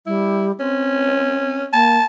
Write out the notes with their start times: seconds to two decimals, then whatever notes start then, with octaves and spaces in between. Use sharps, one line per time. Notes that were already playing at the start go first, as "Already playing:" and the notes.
0.07 G3 E4
0.60 C4 C#4
1.73 A#3 A5